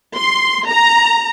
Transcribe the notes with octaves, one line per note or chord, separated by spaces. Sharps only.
C6
A#5